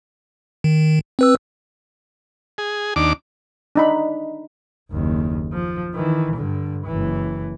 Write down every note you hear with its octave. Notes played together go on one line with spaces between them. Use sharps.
D#3
C4 B4 E6
G#4
D#2 D4 D6
D4 D#4 B5
F#1 D#2
F3
D#3 E3
G2 D3
F#1 E3